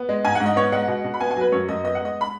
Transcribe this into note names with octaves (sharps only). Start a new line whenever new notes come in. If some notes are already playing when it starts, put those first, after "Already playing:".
Already playing: B3
G#3
G#2 G#5
G#2 F#5
D#5
B3 C#5
G#3 F#5
B2
B2
B5
B3 G#5
G#5
F#3 B4
F#2 C#5
F#2 D#5
B3 D#5
F#5
G#3 D#5
B5